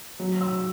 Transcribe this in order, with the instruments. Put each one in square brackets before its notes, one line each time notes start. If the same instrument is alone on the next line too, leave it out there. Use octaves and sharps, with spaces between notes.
[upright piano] F#3
[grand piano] E6